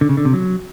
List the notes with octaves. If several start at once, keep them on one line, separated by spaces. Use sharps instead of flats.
D3
C#3
D3
C3
F#3